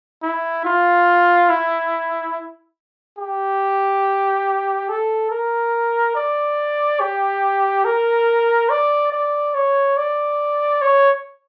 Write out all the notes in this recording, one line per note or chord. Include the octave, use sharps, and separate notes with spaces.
E4
F4
E4
G4
A4
A#4
D5
G4
A#4
D5
D5
C#5
D5
C#5